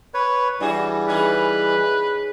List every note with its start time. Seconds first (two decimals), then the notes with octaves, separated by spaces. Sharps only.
0.14 B4 C#5
0.60 E3 G3 D4 F#4 G#4
1.08 C#4 D#4 G#4 B4